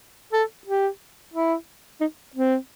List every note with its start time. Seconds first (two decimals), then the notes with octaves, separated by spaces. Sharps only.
0.33 A4
0.67 G4
1.34 E4
2.01 D#4
2.35 C4